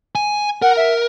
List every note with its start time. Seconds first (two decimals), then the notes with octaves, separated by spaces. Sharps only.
0.15 G#5
0.62 A#4 F#5
0.77 E5